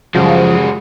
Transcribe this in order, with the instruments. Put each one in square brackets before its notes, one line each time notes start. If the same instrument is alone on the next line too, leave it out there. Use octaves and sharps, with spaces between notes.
[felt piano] F#2 C#3 G3 [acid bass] F3 [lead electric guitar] G#3 F#4